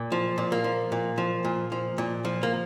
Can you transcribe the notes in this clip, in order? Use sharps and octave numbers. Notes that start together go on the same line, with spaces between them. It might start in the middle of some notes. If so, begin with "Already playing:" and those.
Already playing: A#2
F3
A#2
A#3
F3
A#2
F3
A#2
F3
A#2
F3
A#3